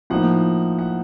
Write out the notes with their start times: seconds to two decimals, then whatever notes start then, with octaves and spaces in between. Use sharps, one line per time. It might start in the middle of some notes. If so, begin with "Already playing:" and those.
0.10 A2 F3 A#3 D#4 F#5
0.79 F#5